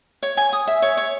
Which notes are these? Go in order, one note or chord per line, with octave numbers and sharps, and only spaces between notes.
C#5
G#5
D#6
E5
C#5
C#5